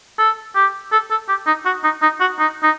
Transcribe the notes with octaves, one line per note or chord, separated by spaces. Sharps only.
A4
G4
A4
A4
G4
D#4
F#4
D#4
D#4
F#4
D#4
D#4